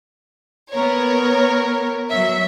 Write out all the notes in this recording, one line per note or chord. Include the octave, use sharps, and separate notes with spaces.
B3 A#4 C#5
F#3 E5